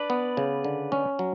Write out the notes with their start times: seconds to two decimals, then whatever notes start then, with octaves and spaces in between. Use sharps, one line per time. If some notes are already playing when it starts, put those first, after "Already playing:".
Already playing: D4 B4 D5
0.10 B3
0.37 C#3
0.64 D3
0.92 C#4
1.19 F#3